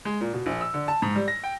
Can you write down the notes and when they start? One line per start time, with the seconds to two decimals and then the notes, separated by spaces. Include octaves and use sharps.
0.05 G#3
0.21 A#2
0.33 B2
0.46 A#1
0.61 E6
0.74 D3
0.88 A5
1.02 G#2
1.15 G3
1.28 A#6
1.44 G5